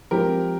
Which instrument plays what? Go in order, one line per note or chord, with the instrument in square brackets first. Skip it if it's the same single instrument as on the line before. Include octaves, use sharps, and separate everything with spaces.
[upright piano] F3 G#3 C4 [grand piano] G4 A#4